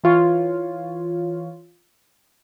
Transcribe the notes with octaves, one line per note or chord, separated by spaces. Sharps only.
E3 F4 C#5